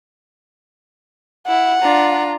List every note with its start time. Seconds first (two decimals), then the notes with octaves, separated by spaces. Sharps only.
1.46 E4 F#5
1.81 D4 F4 A#5